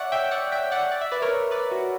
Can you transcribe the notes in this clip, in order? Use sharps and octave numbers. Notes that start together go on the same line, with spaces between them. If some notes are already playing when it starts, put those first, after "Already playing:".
Already playing: C#5 D5 E5 F#5
E5 G5
D5 F#5
E5 G5
D5 F#5
D5
E5
B4 D5
A#4 C#5
B4 D5
F#4